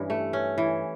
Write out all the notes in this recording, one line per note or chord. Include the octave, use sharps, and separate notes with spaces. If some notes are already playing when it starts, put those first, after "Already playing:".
Already playing: G2 E3 C#4
A3
C#4
E3